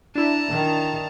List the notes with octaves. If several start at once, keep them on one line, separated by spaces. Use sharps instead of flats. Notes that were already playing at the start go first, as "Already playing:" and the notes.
D4 E4 A5 A#5
D#3